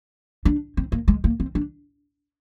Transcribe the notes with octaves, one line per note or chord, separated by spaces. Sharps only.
D4
C4
A#3
G#3
A#3
C4
D4